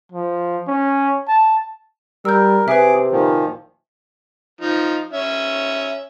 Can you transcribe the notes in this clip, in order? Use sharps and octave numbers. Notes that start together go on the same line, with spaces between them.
F3
C#4
A5
G3 A#4 E6 G6
C3 G#4 B4 E5 D6
A#2 D#3 F3
F3 D#4
C#4 E5